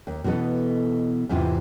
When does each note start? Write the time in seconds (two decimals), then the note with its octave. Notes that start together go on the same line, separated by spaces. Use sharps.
0.07 D#2
0.24 B2 E3 B3 A4 D#5
1.29 E2 G#2 C3 E3 F4